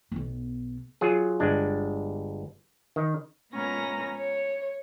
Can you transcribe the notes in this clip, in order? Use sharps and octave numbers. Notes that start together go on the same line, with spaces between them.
B1 B3
F#3 F4 G#4
G1 G#3 D4
D#3
A#2 G#3 B3 C#4 A#5 A#6
C#5